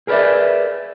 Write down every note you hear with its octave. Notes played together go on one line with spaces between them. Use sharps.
G#4 A#4 B4 C#5 D5 E5